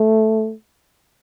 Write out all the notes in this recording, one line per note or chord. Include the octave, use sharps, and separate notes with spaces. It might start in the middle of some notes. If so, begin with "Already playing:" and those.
Already playing: A3